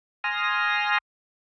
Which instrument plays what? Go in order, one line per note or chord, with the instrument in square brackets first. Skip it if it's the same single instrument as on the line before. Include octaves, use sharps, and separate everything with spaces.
[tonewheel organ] G#5 C6 D#6 F6 A#6